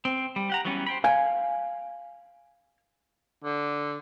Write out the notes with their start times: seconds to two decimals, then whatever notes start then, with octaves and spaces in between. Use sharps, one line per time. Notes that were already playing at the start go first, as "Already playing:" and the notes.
0.05 C4
0.36 G3
0.50 G4 F#5 A#5
0.65 E3 F#3 G3 B3 C#4
0.86 C5 G5 B5
1.04 F5 G#5
3.44 D3